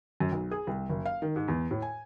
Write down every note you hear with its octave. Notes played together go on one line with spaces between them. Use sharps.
F#2
B1
G#4
C2
F#1
F5
D#3
G#2
E2
A2
G#5